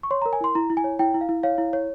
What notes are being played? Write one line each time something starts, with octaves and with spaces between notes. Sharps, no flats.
C#6
C#5 C6
A#5
A#4
G#5
E4 C6
E4 A#5
E4
G#5
C#5
E4 G5
E4
F5
E4
C#5 F5
E4
C#5